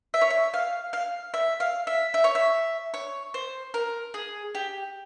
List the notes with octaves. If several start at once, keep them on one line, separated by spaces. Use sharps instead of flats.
E5
C#5
E5
F5
F5
E5
F5
E5
E5
C#5
E5
C#5
C5
A#4
G#4
G4